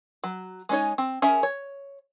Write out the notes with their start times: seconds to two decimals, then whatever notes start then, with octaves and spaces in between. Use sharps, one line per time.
0.24 F#3
0.69 G#3 C#4 D#4 C#5
0.98 C4
1.22 C#4 G#4 A#4 E5
1.43 C#5